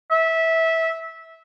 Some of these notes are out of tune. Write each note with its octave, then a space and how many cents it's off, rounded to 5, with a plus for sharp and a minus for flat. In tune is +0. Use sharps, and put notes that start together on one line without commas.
E5 -15